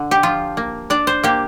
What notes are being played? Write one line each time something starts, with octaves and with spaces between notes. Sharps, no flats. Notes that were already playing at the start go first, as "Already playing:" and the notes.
Already playing: D3
G4
F3 F4
A#3
D4 D5
C5
A#3 G4